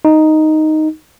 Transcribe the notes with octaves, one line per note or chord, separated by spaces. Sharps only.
D#4